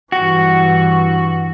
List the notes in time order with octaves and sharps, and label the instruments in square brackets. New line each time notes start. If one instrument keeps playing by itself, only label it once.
[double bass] G2 E3 [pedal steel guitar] F#4